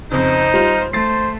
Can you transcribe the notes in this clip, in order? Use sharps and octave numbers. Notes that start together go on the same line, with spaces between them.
F2 C#3 D#4 C5
G3 F4
A3 C5 A6 C7